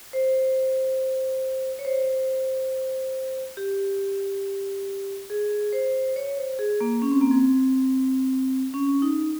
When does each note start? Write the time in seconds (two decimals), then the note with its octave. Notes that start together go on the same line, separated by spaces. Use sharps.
0.13 C5
1.79 C#5
1.85 C5
3.57 G4
5.30 G#4
5.73 C5
6.16 C#5
6.37 C5
6.59 G#4
6.81 A#3
7.02 C#4
7.12 C4
7.21 A#3
7.31 C4
8.74 C#4
9.02 D#4